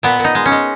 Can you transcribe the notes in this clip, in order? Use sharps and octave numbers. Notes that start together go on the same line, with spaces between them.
A#2 B3
A#2
D#4
G#3
C#4
G#3